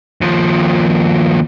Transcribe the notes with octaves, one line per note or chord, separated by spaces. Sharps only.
D#2 F3